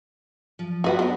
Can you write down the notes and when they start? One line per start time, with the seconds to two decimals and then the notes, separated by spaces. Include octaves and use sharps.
0.59 F3
0.84 G3 F4 F#4 B4 F#5
0.99 B3 D4 C#5